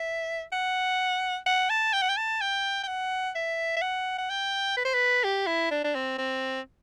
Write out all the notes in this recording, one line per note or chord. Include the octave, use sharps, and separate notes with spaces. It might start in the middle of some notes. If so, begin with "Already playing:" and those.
Already playing: E5
F#5
F#5
A5
G5
F#5
G5
A5
G5
G5
F#5
E5
E5
F#5
F#5
G5
B4
C5
B4
G4
E4
D4
D4
C4
C4